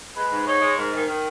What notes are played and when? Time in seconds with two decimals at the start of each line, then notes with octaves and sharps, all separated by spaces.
0.16 G#3 B4
0.32 G#2
0.47 D#4 C#5
0.61 G#3
0.78 G#2 A#4
0.93 D#3
1.07 D#3